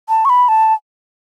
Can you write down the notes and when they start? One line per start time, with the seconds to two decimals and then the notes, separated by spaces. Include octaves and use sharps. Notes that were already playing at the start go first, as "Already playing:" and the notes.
0.09 A5
0.25 C#6
0.30 B5
0.49 A5